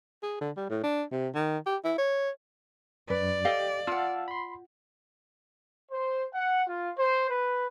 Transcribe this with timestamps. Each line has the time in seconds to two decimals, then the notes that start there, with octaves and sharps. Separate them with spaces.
0.23 G#4
0.41 D3
0.57 G3
0.70 A2
0.83 D4
1.12 C3
1.35 D#3
1.66 G4
1.84 E4
1.98 C#5
3.10 F#2 B4 D5
3.45 G4 A4 D#5 F5
3.87 F4 F5 F#5 A5 E6
4.28 B5 C6
5.91 C5
6.32 F#5
6.68 F4
6.98 C5
7.28 B4